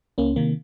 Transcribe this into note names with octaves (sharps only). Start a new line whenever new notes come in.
C#2 A#3 C#4
C3 D#3 A#3